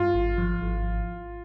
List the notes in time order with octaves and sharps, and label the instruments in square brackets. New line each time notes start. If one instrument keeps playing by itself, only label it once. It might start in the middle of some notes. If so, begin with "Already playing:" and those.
Already playing: [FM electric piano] G2 [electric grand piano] F4
[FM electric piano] G#1
F3
G#1